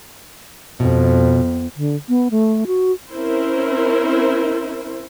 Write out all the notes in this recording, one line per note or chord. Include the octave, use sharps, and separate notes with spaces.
F2 B2
D3
B3
A3
F#4
C4 C#4 E4 A#4 C5